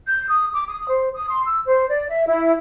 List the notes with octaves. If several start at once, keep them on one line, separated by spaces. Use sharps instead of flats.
G6
D#6
D6
D#6
C5
D#6
C6
E6
C5
D5
E5
E4